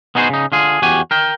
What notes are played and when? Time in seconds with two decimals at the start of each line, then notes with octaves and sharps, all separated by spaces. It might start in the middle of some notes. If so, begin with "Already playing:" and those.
0.15 B3 D#4 F#4 G#4 A#4 C5
0.30 C#3 D#4
0.52 D3 F4 G#4
0.82 E2 F#4 G4 G#5
1.11 A#4 G5